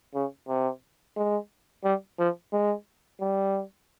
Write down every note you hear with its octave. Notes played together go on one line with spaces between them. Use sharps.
C#3
C3
G#3
G3
F3
G#3
G3